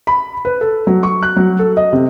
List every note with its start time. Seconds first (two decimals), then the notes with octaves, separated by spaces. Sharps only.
0.07 B5
0.45 B4
0.61 A4
0.87 F#3
1.03 C#6
1.23 F#6
1.36 F#3
1.59 A4
1.77 D#5
1.93 C3